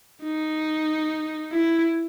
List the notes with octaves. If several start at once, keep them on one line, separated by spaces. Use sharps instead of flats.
D#4
E4